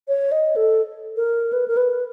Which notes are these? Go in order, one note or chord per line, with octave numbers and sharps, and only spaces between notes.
C#5
D#5
A4
A#4
B4
A#4
B4